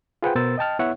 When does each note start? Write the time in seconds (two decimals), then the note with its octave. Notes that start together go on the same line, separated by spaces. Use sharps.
0.22 F4 G#4 B4 C5 F#5 G5
0.35 B2 B3 A#4 C5 E6 A6
0.58 D#5 G5 A5 F6
0.79 B3 E4 C#5 E5 F#5